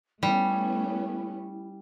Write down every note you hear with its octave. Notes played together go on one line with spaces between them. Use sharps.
G3 A3 B3 C#4 E4